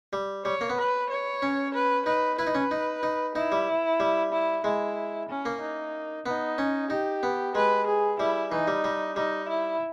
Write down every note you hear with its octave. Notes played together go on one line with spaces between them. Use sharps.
G3
G3 C#5
A#3
B3
B4
C#5
C#4
B4
D#4 B4
E4 B4
D#4
C#4
D#4
D#4
D#4 E4
G3
G3
E4
G#3 E4
C#4
A#3
D#4
B3 D#4
C#4
D#4 G4
B3
G#3 B4
G#4
G3 E4
E3 D#4
G3
G3
G3 D#4
E4